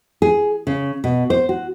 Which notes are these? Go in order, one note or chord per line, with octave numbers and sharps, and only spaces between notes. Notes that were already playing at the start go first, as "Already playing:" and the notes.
G#4
C#3
B2
C5
F#4